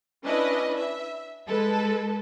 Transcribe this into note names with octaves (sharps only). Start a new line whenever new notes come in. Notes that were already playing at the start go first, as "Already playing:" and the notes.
C#4 D4 E4 B4 D#5
E5
G#3 A4 B4